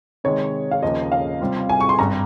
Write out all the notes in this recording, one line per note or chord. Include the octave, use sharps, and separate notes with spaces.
C3 D#3 G#3 C#5
F5
D#2 C#3 F3 A#3 D#5
F5
C3 G3 C4 F4
G#5
C#6
C6
G#1 G2 G3 A#5